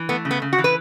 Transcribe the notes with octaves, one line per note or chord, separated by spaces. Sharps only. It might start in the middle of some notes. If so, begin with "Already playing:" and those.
Already playing: E3
A3 B3
C#3
B3
C#3
F#4
E3
B4